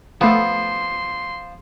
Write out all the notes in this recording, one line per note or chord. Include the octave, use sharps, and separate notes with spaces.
F3 A3 B3 A4 F#5 C6